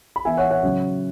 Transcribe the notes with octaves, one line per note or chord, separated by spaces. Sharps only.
B5
E3 B3 E5 G#5
C#5 F#5
C#5 F#5
C#3 F#3 C#4